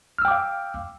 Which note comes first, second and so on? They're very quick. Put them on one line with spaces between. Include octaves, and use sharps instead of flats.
F6 E6 G5 D6 F5